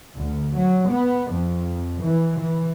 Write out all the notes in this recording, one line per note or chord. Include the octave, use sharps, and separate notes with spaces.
D2
F#3
B3
F2
E3
E3